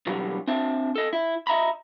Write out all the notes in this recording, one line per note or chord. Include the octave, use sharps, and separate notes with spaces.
B2 D3 E3 F#3 G3
C4 D4 E5 A5
A4 D#5
E4
D#5 E5 A#5 B5